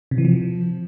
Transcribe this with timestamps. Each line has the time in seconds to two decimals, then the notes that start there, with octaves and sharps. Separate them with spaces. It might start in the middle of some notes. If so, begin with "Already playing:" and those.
0.11 C3
0.18 E3
0.25 F3